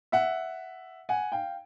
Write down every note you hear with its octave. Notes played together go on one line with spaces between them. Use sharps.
E5 F#5
F#5 G#5
F5 G5